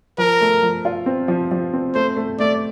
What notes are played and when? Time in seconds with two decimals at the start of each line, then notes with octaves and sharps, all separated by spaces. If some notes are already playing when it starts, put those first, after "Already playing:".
0.18 F3 A#4
0.41 A3
0.62 F3
0.85 F4
1.06 C4
1.28 F3
1.51 F3
1.73 C4
1.95 A3 C5
2.17 A3
2.39 A3 D5